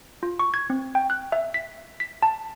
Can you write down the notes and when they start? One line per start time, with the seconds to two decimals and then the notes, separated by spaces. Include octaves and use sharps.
0.23 F4
0.39 C#6
0.54 G#6
0.70 C4
0.95 G5
1.10 F#6
1.32 E5
1.54 B6
2.00 B6
2.23 A5